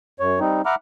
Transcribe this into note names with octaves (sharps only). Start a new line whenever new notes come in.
F#2 C#5
G3 C4 D#4
E5 F#5 A#5 B5 D6 F6